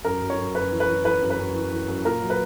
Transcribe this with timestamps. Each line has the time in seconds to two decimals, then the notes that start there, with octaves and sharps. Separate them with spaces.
0.05 F#2 A#4
0.22 F#2
0.30 C#5
0.39 F#2
0.55 F#2 B4
0.72 E3
0.80 B4
0.88 E3
1.05 E3 B4
1.21 F#2
1.30 B4
1.39 F#2
1.55 E3
1.72 E3
1.88 F#2
2.05 A#2 A#4
2.22 F#3
2.30 B4